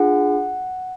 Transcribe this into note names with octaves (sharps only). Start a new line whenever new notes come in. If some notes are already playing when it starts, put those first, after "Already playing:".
Already playing: D4 F4 G#4 F#5